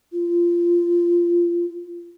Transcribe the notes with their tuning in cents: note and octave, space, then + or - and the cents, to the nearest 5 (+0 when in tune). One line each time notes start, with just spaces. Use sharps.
F4 -15